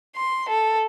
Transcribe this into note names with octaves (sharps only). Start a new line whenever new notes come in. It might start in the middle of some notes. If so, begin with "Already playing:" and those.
C6
A4